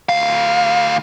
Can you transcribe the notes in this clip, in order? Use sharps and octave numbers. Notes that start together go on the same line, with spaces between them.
D2 F5